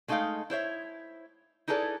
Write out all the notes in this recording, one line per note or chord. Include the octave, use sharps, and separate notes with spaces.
G#3 A3 D#4 F#4 F5 G5
E4 C5 C#5 E5
D#4 E4 G#4 A4 B4 D5